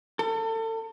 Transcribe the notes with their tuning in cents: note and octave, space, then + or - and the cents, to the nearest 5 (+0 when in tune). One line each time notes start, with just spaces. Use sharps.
A4 +35